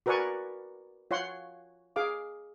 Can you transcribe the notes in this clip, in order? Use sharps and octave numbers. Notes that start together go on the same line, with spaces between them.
F#4 A#4 B4 D5 G#5 C#6
F4 C#5 F#5 C6
G#4 F5 D6